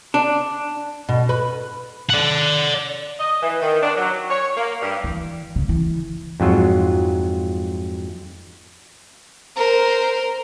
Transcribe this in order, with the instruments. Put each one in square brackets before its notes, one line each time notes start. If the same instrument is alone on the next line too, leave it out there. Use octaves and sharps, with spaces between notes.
[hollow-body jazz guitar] D4
[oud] B2
B4
[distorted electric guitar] D5 F#5
[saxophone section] D#5
E3
D#3
D4
F#3
C#5
A#3
G2
[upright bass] E3
C#3
E3
[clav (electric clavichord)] F2 G#2 F#3 F4
[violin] A#4 C5